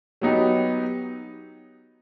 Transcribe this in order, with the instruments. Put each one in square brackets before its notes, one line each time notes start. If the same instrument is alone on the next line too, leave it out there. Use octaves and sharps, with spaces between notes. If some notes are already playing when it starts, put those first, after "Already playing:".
[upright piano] F#3 B3 D#4 G4